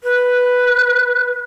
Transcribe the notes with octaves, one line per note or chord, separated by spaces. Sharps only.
B4